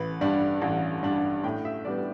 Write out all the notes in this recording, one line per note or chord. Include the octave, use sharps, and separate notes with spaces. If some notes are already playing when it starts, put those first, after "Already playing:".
Already playing: A1 B4
G2 G3 D4
A1
G2 G3 D4
A2 G5
E5
G3 B3 D4 D5